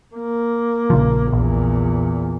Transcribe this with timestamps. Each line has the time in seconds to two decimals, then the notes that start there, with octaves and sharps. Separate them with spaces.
0.16 A#3
0.90 A#1 C#3 F3
1.32 A#1 E2 A#2